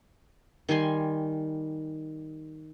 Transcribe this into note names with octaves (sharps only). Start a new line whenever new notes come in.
D#3 G3 G#5 C6